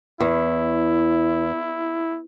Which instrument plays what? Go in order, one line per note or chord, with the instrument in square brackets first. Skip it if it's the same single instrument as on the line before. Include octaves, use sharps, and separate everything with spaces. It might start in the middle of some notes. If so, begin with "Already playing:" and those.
[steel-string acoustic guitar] E2 [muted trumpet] E4